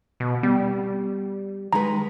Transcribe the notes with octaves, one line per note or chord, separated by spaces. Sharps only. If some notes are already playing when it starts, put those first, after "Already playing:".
B2
G3 B3
D#3 G#3 B4 A#5